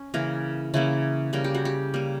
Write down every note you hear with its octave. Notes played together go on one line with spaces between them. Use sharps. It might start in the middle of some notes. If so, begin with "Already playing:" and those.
Already playing: C#4
C#3 E3 A#3 A#4
C#3 E3 A#3 E4
C#3 G3 A#3 A#4
G4
F#4
G4
C#3 G3 A#3